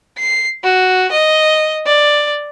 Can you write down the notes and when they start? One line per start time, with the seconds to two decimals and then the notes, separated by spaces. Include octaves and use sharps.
0.19 C7
0.64 F#4
1.12 D#5
1.86 D5